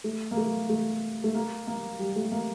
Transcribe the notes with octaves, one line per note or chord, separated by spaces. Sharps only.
A3
A#3
A3
A3
A3
A#3
A#3
G3
A3
A#3